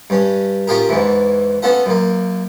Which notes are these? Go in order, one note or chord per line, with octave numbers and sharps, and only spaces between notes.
G2 C#4
C#4 F4 G4 G#4 A#4
E2 G#2 E3
B3 C#4 F4 A4 F#5
F#2 A#3